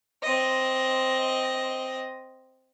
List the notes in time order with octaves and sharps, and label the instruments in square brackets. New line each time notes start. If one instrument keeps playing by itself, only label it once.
[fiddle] C4 D#5